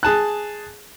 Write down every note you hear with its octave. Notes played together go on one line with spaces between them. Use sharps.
G#4 A5 F#6